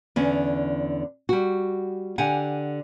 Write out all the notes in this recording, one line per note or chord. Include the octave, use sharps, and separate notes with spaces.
E2 D3 C#4
G3 F#4
D3 G4 F#5 G#5